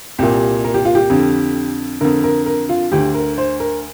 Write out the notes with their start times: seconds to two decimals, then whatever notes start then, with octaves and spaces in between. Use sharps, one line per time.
0.19 C2 A#2 G4
0.64 A#4
0.74 G4
0.85 F4
0.95 G4
1.10 F2 D3
2.01 F2 D3 A#4
2.24 A#4
2.46 A#4
2.69 F4
2.92 D2 D3 G4
3.15 A#4
3.38 C5
3.60 A#4